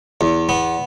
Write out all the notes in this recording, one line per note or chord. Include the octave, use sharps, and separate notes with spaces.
E2
B3